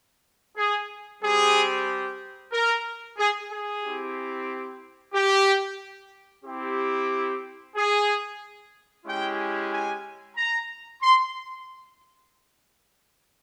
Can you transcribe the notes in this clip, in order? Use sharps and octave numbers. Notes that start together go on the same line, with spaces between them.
G#4
G3 C4 G4 G#4
A#4
G#4
G#4
C4 E4 G4
G4
C4 E4 G4
G#4
G#3 C#4 E4 G4 G5
G#5
A#5
C6